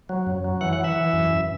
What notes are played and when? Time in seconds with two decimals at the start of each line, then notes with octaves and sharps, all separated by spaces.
0.09 F#3
0.26 F#2
0.45 F#3
0.61 E3 F#5
0.73 F#5
0.79 E3
0.84 E5
0.96 E3
1.13 F#2
1.30 F#2